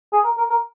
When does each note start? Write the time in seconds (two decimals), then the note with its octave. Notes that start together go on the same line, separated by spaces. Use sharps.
0.13 G#4
0.24 A#4
0.37 A#4
0.50 A#4